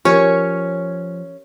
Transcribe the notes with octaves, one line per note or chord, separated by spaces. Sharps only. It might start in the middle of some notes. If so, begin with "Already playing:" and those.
F3 C#4 G4 A#4 C#5